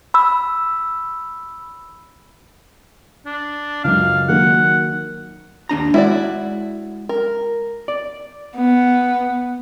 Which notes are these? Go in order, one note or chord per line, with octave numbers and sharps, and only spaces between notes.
B5 E6
D4
C#2 F#2 F5
D#3 F#3 A#3 F#5
D#2 D4 A#5
G#3 E4 F#4 D5
A#4
D5
B3